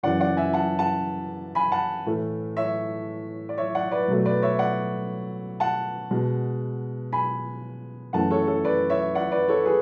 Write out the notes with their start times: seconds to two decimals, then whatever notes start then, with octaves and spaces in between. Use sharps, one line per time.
0.03 F#2 C#3 E3 D5 F#5
0.20 D5 F#5
0.37 E5 G#5
0.53 F#5 A5
0.79 F#5 A5
1.55 G#5 B5
1.72 F#5 A5
2.06 A2 E3 A3
2.57 C#5 E5
3.49 D5
3.58 C#5 E5
3.75 D5 F#5
3.91 B4 D5
4.08 B2 F#3 A3
4.25 B4 D5
4.42 C#5 E5
4.59 D5 F#5
5.60 F#5 A5
6.11 B2 G#3
7.13 G#5 B5
8.13 F#2 E3 A3 F#5 A5
8.30 A4 C#5
8.47 A4 C#5
8.64 B4 D5
8.90 C#5 E5
9.15 D5 F#5
9.32 B4 D5
9.48 A4 C#5
9.65 G#4 B4